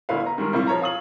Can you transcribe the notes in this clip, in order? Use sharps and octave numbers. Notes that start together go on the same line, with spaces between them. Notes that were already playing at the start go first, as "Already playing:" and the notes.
G1 D2 E4 B4 F5
A#5
D#3 G3 G#3 A#4
C3 G3 E4 F4 C#6
F3 C#5 A#5
F5 D#6 F#7